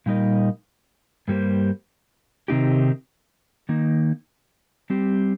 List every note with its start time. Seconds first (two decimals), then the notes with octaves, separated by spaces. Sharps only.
0.06 A#2 G3 D#4 A#4 D#5
1.28 G2 G3 A#3 G4 C5
2.48 C3 D#3 C4 D#4 G4
3.69 D#3 A#3 D#4
4.90 G3 C4 G4